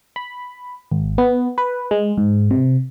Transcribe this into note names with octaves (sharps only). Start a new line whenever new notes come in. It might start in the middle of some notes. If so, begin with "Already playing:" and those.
B5
G#1
B3
B4
G#3
G#2
C3